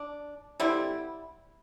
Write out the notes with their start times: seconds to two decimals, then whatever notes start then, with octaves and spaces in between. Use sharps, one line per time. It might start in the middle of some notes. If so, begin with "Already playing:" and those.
Already playing: D4
0.60 D3 G3 C4 E4